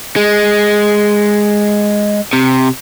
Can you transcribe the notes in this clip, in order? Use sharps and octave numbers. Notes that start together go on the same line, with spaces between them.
G#3
C3